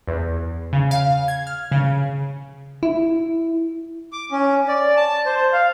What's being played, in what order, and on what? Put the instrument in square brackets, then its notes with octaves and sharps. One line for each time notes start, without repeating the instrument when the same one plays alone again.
[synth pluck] E2
C#3
F5
G#6
F6
C#3
[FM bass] E4
[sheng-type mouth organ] D6
C#4
D5
A5
C5
F5